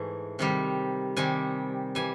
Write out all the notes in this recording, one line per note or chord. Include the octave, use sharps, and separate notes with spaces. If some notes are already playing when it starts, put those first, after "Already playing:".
Already playing: G#2 E3 A3 G#5
C3 D#3 G3
C3 D#3 G3 G#5
E3 G3 G#5